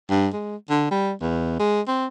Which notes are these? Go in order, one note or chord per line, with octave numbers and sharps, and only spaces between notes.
G2
G#3
D3
G3
E2
G#3
C4